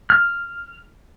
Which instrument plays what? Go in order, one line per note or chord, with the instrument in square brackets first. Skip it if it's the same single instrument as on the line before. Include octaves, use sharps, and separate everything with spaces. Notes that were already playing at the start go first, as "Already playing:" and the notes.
[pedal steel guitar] F6